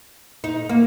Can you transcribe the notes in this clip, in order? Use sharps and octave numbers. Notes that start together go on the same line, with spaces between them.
D#4
A#3